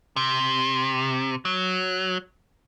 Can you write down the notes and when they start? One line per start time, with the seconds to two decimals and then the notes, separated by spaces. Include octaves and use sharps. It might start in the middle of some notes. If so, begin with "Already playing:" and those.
0.16 C3
1.45 F#3